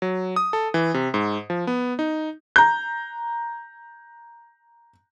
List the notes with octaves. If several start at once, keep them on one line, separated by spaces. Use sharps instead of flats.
F#3
D#6
A4
E3
C3
G#2
F3
B3
D#4
A#5 G6